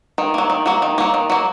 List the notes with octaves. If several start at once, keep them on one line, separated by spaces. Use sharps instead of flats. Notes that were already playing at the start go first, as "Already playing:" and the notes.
D#3
F#3 A#3
D#3
F#3 A#3
D#3
F#3 A#3
D#3
F#3 A#3